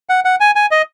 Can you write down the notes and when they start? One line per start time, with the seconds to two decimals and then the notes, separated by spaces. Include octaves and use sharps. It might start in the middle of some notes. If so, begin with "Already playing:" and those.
0.09 F#5
0.25 F#5
0.40 G#5
0.55 G#5
0.71 D#5